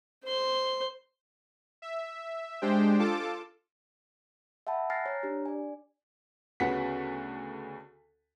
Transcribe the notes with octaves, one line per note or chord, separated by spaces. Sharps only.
C5 C6
E5
G#3 D4 G4 C5 G5
F4 A4 A5 D6
E5 F#5 G5 A5 B5
G#5 F6 F#6 A6 A#6 C7
C#5 A#5
D4 G4
D5 G#5
D2 C#3 B3 F#4 F#5 B6